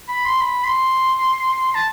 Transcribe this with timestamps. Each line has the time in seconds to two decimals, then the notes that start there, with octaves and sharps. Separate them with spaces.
0.08 B5
0.25 C6
0.41 B5
0.65 C6
1.74 A5